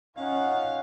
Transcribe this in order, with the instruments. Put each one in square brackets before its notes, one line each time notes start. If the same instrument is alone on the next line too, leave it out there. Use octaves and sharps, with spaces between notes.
[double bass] C#4 D#4 [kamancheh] F4 F#5 [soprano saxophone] F5